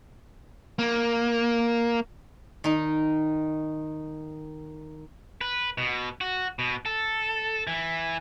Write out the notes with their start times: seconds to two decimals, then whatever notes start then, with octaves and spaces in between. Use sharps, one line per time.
0.79 A#3
2.64 D#3 D#4
5.41 B4
5.78 B2
6.21 F#4
6.59 B2
6.86 A4
7.67 E3